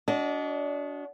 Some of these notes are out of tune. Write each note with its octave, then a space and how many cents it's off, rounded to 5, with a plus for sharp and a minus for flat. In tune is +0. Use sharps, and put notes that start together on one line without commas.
D4 -30 F#4 +0 D#5 +0